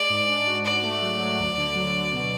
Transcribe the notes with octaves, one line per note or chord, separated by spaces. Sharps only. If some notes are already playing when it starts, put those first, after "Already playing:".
Already playing: G#3 D5
G#2
D4
F#4
G#2 D5
A3
F#3
F#3
D2
D3
F#3
F#3
B2